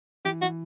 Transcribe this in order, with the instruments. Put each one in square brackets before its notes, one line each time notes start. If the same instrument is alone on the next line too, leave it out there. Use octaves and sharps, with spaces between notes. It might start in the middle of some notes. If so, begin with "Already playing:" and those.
[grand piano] E3 [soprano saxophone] G4
[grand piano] E3 [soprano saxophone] F#4